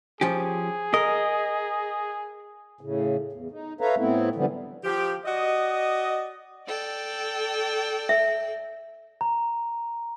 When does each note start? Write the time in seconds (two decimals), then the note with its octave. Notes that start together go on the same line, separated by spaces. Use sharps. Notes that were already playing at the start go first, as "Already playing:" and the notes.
0.21 F3 C#4 G4 G#4
0.94 A#4 D#5
2.81 A2 C#3
3.33 E2
3.51 D#4
3.81 A4 B4 C#5 E5 F5 A#5
3.98 A2 A3 B3 C4 E4
4.36 D3 E3 F3 G3 B3
4.84 F3 G4
5.26 F#4 D5 D#5
6.66 A4 D5 G5
8.09 E5
9.21 A#5